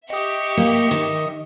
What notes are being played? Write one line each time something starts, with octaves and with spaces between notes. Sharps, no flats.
G4 D#5 E5 C#6 D#6
A#3
D#3